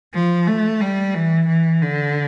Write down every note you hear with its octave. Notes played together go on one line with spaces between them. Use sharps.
F3
A3
G3
E3
E3
D3